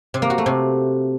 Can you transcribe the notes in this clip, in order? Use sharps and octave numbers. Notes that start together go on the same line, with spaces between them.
C3
A#3
F#4
A3
C3